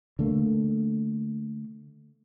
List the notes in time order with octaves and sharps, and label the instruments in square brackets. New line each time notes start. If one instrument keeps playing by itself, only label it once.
[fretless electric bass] D3 A3 A#3